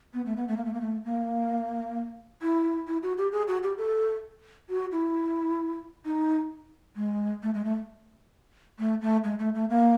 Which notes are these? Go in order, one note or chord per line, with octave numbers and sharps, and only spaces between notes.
B3
A3
B3
A3
A#3
A3
A#3
A3
A#3
E4
E4
F#4
G4
G#4
F#4
G4
A4
F#4
E4
D#4
G#3
A3
G#3
A3
A3
A3
G#3
A3
A3
A#3